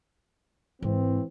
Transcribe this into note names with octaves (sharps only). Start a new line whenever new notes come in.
G#1 G#2 E3 C4